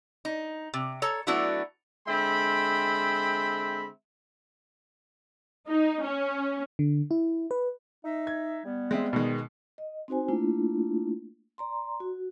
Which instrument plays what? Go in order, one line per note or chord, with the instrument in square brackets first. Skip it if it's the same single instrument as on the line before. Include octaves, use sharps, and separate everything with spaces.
[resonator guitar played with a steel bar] D#4
C3
A4 C#5 A#5
F#3 A3 B3 D4 E4 F#4
[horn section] D3 G#3 C4 E5 G5 B5
[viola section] D#4
C#4
[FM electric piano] D3
E4
B4
[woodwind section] D#4 E5
[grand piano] G#6
[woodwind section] G3 B3
[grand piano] G#3 C4 E5
B2 D#3 G#3
[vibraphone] D#5
C4 D#4 F#4 C5 G#5
A3 A#3 D4 E4 F4
D5 A#5 C6
F#4